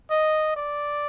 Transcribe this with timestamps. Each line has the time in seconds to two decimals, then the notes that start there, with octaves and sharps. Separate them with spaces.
0.11 D#5
0.56 D5